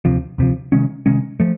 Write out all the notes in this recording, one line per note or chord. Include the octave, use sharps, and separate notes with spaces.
D2 C3 F3
D2 C3 F3
C3 D#3 G#3 C#4
C3 D#3 G#3 C#4
F3 A3